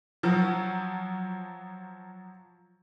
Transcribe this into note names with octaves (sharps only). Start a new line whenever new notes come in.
F3 F#3